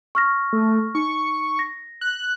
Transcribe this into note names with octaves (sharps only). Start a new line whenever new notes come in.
C#6 F6 A#6
A3
D#4 C#6
A#6
F#6